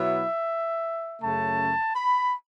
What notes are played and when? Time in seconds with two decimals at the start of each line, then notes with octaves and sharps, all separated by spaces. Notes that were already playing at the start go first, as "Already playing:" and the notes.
Already playing: B2 F#3 B3 E4 E5
1.21 F#2 C#3 A3 A5
1.96 B5